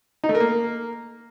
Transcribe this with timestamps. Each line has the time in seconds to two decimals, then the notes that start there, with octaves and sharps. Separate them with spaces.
0.24 D#4
0.29 A3
0.35 A#4
0.40 A#3